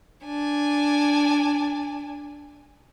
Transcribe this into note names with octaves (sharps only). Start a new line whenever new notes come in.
D4 G#5